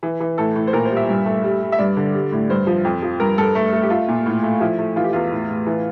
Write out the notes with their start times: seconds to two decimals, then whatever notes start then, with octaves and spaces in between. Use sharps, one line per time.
0.03 E3
0.20 E3
0.38 A2 A4
0.55 A2
0.67 C5
0.73 A#2 A#4
0.85 C5
0.90 G3
0.97 E5
1.09 G2
1.26 A3
1.44 G3
1.61 G3
1.72 E5
1.78 G2 D5
1.97 D3
2.14 G3
2.32 A2
2.50 G2 C5
2.67 F3
2.85 F2
3.02 F3
3.20 G2 A#4
3.38 G2 A4
3.55 A3
3.73 A3
3.83 G4
3.90 A3 F4
4.08 A#2
4.26 A2
4.43 A3
4.61 F3 E4
4.79 A3
4.96 E3 F4
5.04 G4
5.13 E2 F4
5.31 A2
5.49 A2
5.67 E3